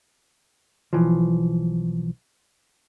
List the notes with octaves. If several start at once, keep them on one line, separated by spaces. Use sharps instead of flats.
B1 E3 F3